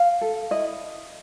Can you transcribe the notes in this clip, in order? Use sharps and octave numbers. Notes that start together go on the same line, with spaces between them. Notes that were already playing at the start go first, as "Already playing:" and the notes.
Already playing: F5
A4
E4 D#5